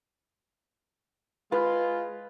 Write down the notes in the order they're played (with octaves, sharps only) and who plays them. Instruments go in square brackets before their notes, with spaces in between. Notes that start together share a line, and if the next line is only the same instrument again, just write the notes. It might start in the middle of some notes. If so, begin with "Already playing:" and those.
[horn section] G#3 F4 [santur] B4